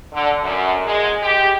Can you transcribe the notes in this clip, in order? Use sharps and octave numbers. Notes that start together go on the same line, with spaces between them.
D3
F#2
G#3
G4